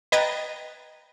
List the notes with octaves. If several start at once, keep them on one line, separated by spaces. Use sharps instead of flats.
B4 D#5 G5 A#5 G#6 A6